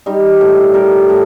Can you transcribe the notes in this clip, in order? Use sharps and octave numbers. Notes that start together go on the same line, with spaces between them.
G3 D#4 G4
A2
G3 G4 A#4
A2